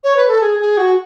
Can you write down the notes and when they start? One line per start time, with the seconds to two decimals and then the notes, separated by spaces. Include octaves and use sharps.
0.04 C#5
0.16 B4
0.28 A4
0.41 G#4
0.59 G#4
0.77 F#4